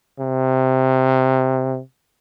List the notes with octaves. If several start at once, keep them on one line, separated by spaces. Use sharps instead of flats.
C3